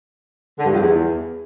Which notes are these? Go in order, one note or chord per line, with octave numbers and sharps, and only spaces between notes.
D3
G2
F2
E2